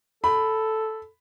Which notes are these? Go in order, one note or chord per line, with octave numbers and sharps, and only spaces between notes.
A4 B5